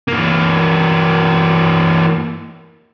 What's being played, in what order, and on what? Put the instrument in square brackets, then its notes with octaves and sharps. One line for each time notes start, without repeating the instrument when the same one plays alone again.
[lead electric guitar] E3 A#3